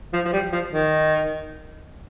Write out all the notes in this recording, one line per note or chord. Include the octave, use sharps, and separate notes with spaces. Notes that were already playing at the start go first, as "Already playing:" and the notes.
F3
F3
G3
F3
D#3